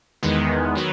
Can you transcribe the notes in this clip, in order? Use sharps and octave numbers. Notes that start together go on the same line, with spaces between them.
E2 D#3 G#3 B3
D#3 F#3 B3